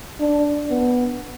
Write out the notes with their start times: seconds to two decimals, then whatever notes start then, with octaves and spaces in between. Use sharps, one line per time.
0.20 D4
0.70 B3